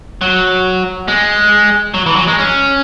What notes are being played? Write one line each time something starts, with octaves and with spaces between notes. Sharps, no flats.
F#3
G#3
F#3
E3
F#3
G#3
C#4